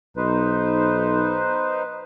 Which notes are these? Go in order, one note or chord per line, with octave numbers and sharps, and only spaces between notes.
B1 D#4 B4 C5